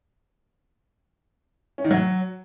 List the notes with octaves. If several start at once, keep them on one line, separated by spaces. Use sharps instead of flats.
C#4
D#3
F#3